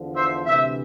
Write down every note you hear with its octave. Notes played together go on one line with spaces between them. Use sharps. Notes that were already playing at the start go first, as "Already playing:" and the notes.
Already playing: E2 D3 F3
C5 E5
D2 C3 E3 C5 E5